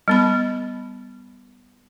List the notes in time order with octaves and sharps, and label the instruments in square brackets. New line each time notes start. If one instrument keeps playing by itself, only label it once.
[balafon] G3 B3 B5